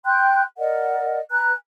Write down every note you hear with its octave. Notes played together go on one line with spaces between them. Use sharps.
G5 C6 F#6 G6
A#4 D5 D#5 F#5
B4 G#5 A#5 F#6